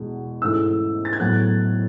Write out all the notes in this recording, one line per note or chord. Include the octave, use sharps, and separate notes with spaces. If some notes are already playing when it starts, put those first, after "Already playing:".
Already playing: E2 B2 G#3
G#2 E3 A3 C#4 E4 E6
A6
G#6
A2 F#3 B3 F#6